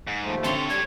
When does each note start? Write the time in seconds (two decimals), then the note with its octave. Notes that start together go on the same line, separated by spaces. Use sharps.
0.07 G#2
0.24 D#2 F3 A3
0.44 D3 C4 G4 A4 C#5 C6
0.69 G3 G#6